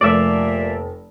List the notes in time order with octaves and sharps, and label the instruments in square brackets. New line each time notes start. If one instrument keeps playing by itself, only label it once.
[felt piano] F1 [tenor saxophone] A#2 [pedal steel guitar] D5 E5